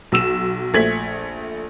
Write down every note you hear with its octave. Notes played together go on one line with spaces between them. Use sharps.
B1 E6 E7
A#1 A3 G#6 B6 F#7